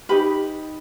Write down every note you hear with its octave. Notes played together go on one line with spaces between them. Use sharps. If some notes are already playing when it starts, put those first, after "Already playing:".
D#4 G4 B4 B5